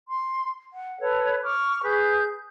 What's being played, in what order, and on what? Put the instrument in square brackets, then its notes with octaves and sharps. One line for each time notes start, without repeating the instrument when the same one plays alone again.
[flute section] C6
F#5
A4 B4 C#5
C#6 D6 F6
G#4 B4 G6